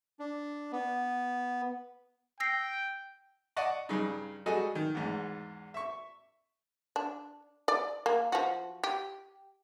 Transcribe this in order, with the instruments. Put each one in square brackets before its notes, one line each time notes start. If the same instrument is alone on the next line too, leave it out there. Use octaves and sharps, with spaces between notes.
[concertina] D4
B3
[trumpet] G5 [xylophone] E6 A#6 C7
[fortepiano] D5 D#5 F#5 A5 C#6
G2 C#3 D#4
G3 G#3 F#4 G#4 A4 D#5
D#3
E2 G#2
E5 C#6
[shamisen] D4
D5
A#3
F3 F#4
G4